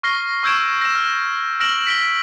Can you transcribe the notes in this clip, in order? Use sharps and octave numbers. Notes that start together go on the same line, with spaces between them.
C#6 F6 A#6 C7 G7
C#6 E6 G6 G#6 D7 E7
A#6 E7
F6
E6 F6 A#6 D7 E7 F#7
B6 D7 G7